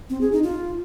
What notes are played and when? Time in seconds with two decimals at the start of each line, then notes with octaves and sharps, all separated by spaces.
0.10 C4
0.21 G#4
0.32 D#4
0.44 F4